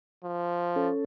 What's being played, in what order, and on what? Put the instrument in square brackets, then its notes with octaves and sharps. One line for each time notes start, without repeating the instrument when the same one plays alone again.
[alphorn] F3
[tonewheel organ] C#4 A4